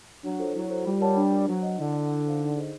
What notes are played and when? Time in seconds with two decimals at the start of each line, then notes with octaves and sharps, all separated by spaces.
0.23 F#3 D4
0.39 F4 A4 C5
0.54 F#3 E4
0.70 A4 C5
0.85 G3 F4
1.00 A#4 C#5 F#5 A5
1.16 D4
1.32 F4 A#4
1.47 F#3 C5
1.63 D#5 F#5
1.78 D3 E4
1.93 A4 D5 F#5
2.09 E4
2.24 A4 C5 F5
2.40 D#4
2.55 G#4 C5 D#5